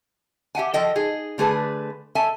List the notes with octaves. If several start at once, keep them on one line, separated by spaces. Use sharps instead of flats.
G4 E5 F#5 G#5
F3 A4 D#5 G5
D#4 G#4
D3 A3 G#4 B4
A4 E5 G#5